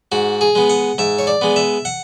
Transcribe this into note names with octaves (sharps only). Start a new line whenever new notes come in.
G#2 F#4
G#4
G#3 B3
F#5
G#2 E5
C#5
D5
G#3 B3
E5
F#5